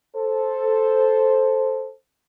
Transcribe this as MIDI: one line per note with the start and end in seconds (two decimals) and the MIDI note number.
0.16 1.91 69
0.16 1.91 72